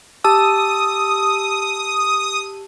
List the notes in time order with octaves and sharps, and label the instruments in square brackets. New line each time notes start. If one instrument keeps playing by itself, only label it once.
[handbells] G4 A5 E6 [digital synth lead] D#6